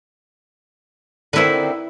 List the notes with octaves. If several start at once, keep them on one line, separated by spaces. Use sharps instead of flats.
D3 D#3 C4 E4 B4